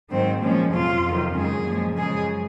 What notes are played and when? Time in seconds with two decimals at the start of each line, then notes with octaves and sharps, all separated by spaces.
0.12 G#2 D#3 F#3 C4
0.43 A#2 F3 G#3 C#4
0.74 F2 C3 F#3 F4
1.05 F2 C3 D#3 F#3
1.36 F#2 C#3 G#3 G#4
1.67 A#2 F3 G#3
1.98 F#2 C#3 F3 G#3 G#4